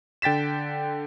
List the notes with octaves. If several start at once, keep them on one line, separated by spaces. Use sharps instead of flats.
D3 G5 A6 B6 E7